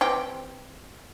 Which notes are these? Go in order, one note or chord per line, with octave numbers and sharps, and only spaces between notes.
E3 C4 G4